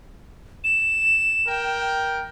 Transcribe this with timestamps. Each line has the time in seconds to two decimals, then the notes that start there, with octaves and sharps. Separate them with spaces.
0.64 E7
1.47 A#4 G5